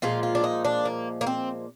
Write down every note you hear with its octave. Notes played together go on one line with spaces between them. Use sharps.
A#2 F3 G#3 F4
F4
D4
D#4
D4
A#3
A#3
C4